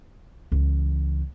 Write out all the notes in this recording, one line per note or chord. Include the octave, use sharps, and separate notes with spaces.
C#2 E3